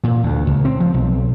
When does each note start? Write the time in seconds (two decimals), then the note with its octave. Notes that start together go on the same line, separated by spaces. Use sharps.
0.04 A#2
0.23 D2
0.47 C#2
0.65 C4
0.80 F3
0.94 B1